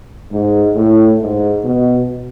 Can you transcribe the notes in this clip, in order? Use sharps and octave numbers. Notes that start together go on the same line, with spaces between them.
G#2
A2
G#2
B2